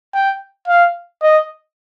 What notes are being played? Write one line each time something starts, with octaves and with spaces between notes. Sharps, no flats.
G5
F5
D#5